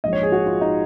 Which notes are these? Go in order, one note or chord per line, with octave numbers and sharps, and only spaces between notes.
A#1 G#2 F3 D#5
C#5
G#4
F#4
F4
D#4